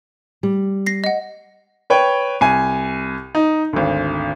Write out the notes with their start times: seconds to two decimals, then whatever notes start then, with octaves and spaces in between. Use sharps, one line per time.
0.43 G3
0.86 A#6 C7
1.04 D#5 F#5
1.90 B4 C#5 G5
2.41 C2 G#5
3.35 D#4
3.73 G#1 D2